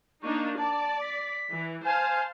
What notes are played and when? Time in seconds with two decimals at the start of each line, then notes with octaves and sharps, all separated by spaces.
0.23 A#3 D4 D#4 C#6
0.58 D5 A5
1.01 B6
1.51 E3
1.85 C5 F5 G#5 A5